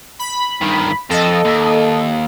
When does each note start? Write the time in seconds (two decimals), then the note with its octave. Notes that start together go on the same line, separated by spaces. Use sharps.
0.19 B5
0.61 G2 D#3
1.10 F2 A4 D#5
1.45 D#2